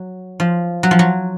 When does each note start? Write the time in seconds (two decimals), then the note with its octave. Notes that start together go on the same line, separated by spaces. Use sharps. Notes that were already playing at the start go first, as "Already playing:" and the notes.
Already playing: F#3
0.40 F3
0.83 F#3
0.91 F3
0.99 F#3